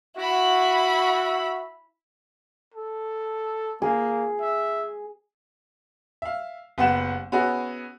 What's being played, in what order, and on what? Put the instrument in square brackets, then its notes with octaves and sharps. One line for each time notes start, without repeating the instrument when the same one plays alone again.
[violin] E4 B5 [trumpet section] F#4 [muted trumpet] E5
[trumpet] A4
[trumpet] A#3 [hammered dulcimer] G#4
[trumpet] E5
[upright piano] E5 F5
F#1 B3 G4 F#5 E7
B3 C#4 E4 F#4 G#4 C#5